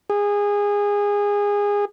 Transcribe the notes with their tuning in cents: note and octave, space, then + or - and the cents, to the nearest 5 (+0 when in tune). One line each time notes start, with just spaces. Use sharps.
G#4 -20